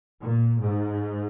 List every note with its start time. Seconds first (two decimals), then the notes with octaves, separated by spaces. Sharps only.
0.19 A#2
0.59 G#2